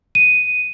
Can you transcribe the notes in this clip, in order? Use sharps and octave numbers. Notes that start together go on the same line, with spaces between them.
D#7